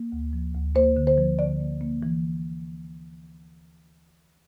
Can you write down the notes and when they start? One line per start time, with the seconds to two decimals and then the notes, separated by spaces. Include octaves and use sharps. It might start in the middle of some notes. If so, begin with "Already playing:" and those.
Already playing: A#3
0.12 D2
0.33 F3
0.54 D2
0.75 A#3 C5
0.97 D3
1.07 C5
1.18 F3
1.39 D3 D5
1.60 A#3
1.81 A#3
2.03 E3